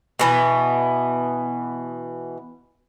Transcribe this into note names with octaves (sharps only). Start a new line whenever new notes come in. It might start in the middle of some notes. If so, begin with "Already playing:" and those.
B2 E3 B3